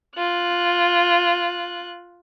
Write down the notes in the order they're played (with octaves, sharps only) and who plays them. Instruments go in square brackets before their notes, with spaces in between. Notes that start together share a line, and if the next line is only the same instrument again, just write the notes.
[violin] F4 F#6